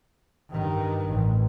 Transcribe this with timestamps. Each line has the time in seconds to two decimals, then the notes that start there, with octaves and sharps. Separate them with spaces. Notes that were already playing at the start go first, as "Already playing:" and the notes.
0.49 G2 D#3
1.07 A1